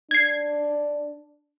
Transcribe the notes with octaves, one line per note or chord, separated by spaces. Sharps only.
D4 G#6 C7